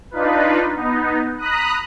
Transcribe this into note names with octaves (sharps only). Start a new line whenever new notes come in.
D4 D#4 F4 B4
B3 D#4
A#5 B5 D#6 F#6